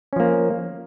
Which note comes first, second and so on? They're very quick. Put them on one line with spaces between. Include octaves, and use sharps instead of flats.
C#4 F3 A#3